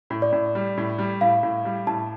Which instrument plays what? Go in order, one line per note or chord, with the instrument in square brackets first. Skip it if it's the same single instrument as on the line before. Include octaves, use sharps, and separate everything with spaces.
[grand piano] A2
[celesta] D5
[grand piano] A2
G3
A2
G3
[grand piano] A2 [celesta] F5
[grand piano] A2
G3
[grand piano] A2 [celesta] A5